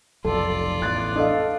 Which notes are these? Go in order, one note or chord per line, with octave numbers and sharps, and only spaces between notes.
F1 B1 F4 A4 D5
A1 E2 F#6 A6
D4 A4 D#5 F5